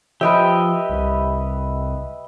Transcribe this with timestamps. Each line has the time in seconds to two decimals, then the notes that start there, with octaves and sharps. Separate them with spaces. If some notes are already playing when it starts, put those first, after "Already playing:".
0.21 F3 G4 B4 D#5 E5 G5
0.90 C2